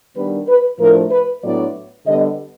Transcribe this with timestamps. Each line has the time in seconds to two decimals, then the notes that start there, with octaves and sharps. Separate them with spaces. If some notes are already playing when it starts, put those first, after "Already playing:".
0.16 D#3 G3 B3 D4 B4
0.49 B4
0.80 A2 F3 A3 D4 A#4
1.11 B4
1.44 A2 F#3 B3 D4 D5
2.06 D3 G3 B3 D#5